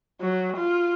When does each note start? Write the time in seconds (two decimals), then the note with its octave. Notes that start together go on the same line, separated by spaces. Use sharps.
0.21 F#3
0.57 F4